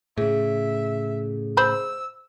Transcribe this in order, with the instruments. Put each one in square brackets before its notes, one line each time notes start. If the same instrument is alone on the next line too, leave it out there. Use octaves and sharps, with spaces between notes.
[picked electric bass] A2 C#3 [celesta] G#4 [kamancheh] E5
[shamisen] C5 B5 [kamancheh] E6